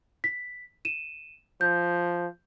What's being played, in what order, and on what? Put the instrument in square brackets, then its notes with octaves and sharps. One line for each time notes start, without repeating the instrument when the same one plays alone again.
[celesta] B6
D#7 E7
[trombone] F3 [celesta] G6